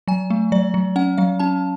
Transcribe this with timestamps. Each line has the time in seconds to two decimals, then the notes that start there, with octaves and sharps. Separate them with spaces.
0.08 F#3 G#5
0.30 A3
0.52 F#3 D5
0.74 F#3
0.96 C#4 F#5
1.18 F#3 F5
1.39 C#4 A5